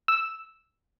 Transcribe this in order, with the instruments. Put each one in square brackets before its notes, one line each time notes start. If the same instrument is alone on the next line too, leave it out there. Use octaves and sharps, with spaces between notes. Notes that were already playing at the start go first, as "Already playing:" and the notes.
[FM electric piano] E6